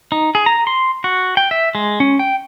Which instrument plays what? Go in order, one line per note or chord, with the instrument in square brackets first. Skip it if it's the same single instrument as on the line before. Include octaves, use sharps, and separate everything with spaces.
[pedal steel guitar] D#4
G#4
A#5
C6
F#4
G5
E5
G#3
C#4
G5